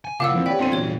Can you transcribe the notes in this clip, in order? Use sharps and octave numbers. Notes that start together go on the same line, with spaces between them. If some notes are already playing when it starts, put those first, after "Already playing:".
G#5
A#2 C#3 E4 F5 F#5 D6 E6 E7
F2 E3 C4
G4 B4 C#5 D5 G5
G1 C4 F4 A4 C6 D#7
E2 A#2 F#3 C#5 G#6